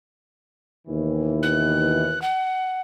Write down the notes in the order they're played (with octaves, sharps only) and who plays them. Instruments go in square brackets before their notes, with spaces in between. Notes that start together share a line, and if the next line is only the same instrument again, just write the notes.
[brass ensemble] D#2 B2 E3
[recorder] F#6
F#5